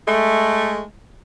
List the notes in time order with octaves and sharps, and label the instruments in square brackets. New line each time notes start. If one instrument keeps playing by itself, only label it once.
[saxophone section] G#3 A3